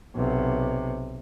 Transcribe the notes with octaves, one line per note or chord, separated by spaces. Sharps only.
B1 C3